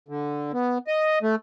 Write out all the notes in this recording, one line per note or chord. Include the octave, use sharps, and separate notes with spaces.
D3
B3
D#5
A3